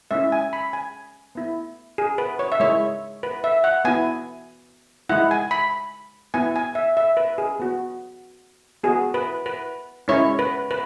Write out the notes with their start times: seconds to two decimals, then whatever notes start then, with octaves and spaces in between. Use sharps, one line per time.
0.11 G#3 C#4 E4 E5
0.32 G#5
0.53 B5
0.73 G#5
1.35 B3 E4
1.98 G#4
2.18 B4
2.39 C#5
2.52 E5
2.60 G#3 E4 C#5
3.23 B4
3.44 E5
3.64 F#5
3.85 B3 E4 G#5
5.09 G#3 E4 F#5
5.31 G#5
5.51 B5
6.34 B3 E4 G#5
6.56 G#5
6.75 E5
6.97 E5
7.17 B4
7.38 G#4
7.60 B3 F#4
8.83 B3 F#4 G#4
9.14 B4
9.46 B4
10.08 G#3 C#4 E4 C#5
10.39 B4
10.71 B4